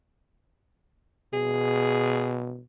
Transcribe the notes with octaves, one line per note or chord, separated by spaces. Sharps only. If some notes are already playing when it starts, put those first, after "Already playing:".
B2 G#4